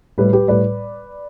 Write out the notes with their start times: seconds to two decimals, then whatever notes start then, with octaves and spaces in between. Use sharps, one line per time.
0.18 A2 G3 G4 B4
0.33 G4 B4
0.48 A2 G3 B4 D5